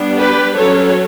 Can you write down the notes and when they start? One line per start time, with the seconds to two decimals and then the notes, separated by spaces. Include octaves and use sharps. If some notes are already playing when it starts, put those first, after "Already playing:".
Already playing: G3 B3 D4
0.17 G4 B4
0.55 F#3 C#4 A4 C#5